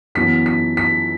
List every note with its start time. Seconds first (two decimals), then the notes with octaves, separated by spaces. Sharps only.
0.15 F#2 E3 B3 E4 B6
0.46 B6
0.77 B6